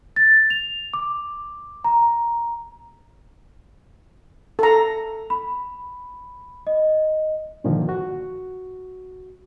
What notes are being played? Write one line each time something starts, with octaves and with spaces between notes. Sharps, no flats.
A6
F7
D6
A#5
A4 A#5
B5
D#5
G2 A#2 D3 D#3 F3
F#4